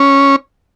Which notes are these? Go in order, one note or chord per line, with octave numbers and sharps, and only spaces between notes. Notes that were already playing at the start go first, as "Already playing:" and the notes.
Already playing: C#4